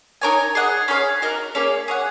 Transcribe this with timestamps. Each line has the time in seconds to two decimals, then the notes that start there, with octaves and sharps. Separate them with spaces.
0.21 D#4 A#4 C#5 G#5
0.55 G#4 D#5 F#5
0.88 C#4 G#4 C#5 F5
1.22 D#4 F#4 A#4
1.55 A#3 C#4 G#4 C#5
1.88 G#4 C#5 F#5